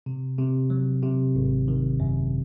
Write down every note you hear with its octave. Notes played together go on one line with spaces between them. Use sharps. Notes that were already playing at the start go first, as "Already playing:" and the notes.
C3
C3
F#3
C3
G#1
D#3
F#2